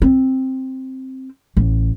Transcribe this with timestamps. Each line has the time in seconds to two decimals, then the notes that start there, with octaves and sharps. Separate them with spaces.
0.02 C4
1.57 A1